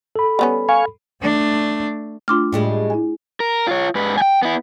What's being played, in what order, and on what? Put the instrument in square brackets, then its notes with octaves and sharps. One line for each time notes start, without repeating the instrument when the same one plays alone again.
[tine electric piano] A4 B5
[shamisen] G3 B3 C#4
[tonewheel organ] F5 G#5 C#6
[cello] A3 D4
[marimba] A3 D4 F4 [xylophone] C6 D6 F6
[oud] A2 G3 G#3
[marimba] E4 G#4 G#5
[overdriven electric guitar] A#4
F4 C#5
G#2 B4
G5 G#5
B3 E4